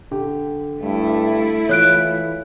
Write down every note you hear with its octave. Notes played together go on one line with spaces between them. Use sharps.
D3 G4
G2 A3 E4
E3 F4 C#5 F#6 D7